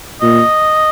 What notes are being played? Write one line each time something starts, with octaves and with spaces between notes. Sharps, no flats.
A#2 D#5